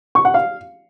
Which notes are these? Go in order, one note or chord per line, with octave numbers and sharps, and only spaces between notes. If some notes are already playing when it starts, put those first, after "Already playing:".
C#6
F#5
F5